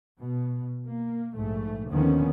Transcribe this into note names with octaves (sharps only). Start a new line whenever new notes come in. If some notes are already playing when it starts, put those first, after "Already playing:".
B2
A#3
A#1 G#2 A3
D#2 D3 D#3 F3 B3 C#4